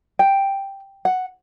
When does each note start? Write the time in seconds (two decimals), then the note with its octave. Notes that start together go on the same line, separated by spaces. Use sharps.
0.19 G5
1.05 F#5